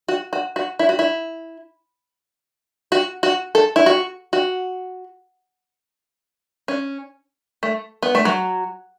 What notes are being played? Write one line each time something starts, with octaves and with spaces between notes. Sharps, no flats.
F#4
F#4
F#4
E4
F#4
E4
F#4
F#4
A4
E4
F#4
F#4
C#4
A3
B3
A3
F#3